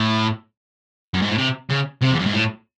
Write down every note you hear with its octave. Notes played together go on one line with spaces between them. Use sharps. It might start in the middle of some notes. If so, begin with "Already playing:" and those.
Already playing: A2
F#2
G#2
A2
C3
C#3
C3
E2
F#2
G#2
A2